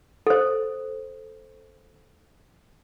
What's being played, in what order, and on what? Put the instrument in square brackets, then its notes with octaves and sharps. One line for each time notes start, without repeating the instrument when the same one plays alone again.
[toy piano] A4 C5